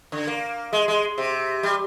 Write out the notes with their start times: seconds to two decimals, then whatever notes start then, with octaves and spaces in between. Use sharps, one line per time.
0.12 D3
0.27 A#3
0.73 G#3
0.88 G#3
1.18 C3
1.63 G3